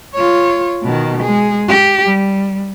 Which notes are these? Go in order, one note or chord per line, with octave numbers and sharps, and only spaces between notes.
F4 C#5
B2 D#3
G#3 G#4
G4
G3